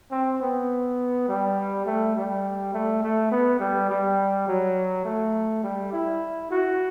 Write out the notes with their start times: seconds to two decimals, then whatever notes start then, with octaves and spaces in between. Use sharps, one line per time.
0.11 C4
0.41 B3
1.28 G3
1.86 A3
2.15 G3
2.73 A3
3.03 A3
3.31 B3
3.60 G3
3.90 G3
4.48 F#3
5.05 A3
5.63 G3
5.93 E4
6.51 F#4